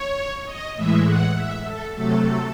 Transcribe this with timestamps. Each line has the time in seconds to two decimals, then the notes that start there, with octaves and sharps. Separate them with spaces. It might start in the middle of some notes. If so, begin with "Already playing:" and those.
Already playing: C#5
0.45 D#5
0.75 A2 E3 G#3 E5
1.05 F#5
1.35 E5
1.64 A4
1.94 C3 F#3 A3 A4